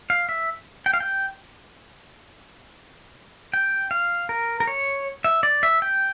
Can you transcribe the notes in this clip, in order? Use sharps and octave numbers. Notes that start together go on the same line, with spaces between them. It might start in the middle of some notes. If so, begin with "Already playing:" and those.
F5
E5
G5
F5
G5
G5
F5
A#4
A#4
C#5
E5
D5
E5
G5